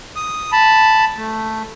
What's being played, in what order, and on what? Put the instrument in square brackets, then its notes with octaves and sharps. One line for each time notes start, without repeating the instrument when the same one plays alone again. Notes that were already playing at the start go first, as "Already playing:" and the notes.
[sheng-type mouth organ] D#6
A5 B5
A3